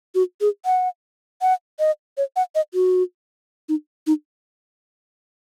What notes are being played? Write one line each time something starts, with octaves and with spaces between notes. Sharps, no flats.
F#4
G#4
F#5
F#5
D#5
C#5
F#5
D#5
F#4
D#4
D#4